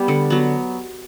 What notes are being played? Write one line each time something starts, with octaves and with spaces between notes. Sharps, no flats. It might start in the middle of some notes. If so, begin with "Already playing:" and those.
Already playing: G3 B3 G4
D3
F#3 B3